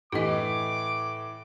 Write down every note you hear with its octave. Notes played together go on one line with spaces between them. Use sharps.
A2 E3 G4 D#5 D6